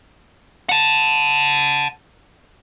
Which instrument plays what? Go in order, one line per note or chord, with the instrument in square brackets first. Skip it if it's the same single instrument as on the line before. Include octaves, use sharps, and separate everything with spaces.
[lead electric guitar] F#5 A5